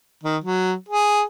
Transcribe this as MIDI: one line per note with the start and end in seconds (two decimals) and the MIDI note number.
0.23 0.37 51
0.44 0.74 54
0.89 1.22 68